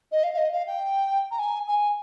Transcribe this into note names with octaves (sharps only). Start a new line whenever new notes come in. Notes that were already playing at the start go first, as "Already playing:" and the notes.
D#5
F5
F5
D#5
F5
G5
A#5
G#5
G#5